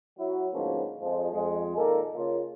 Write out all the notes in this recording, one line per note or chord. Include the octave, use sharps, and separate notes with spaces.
F#3 E4 F#4
D2 G#2 F3 A#3 B3 C#4
F2 F3 G#3
F2 G#3
A#2 D#3 G#3 A#3 A4 A#4
C#3 A#3 F4